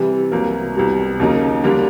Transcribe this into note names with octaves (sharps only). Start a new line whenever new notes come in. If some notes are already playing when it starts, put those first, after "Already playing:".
Already playing: C3 E3 G3
C2 B2 F#3 A#3
C2 B2 G3
D#2 C#3 F#3 A#3 D#4
D3 G3 A#3 D4